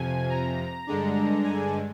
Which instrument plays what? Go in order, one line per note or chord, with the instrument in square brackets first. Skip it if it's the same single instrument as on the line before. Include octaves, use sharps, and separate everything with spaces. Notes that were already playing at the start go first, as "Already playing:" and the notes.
Already playing: [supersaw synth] F2 C3 F3 G#5
A#5
G2 D3 G#3 D4
G#5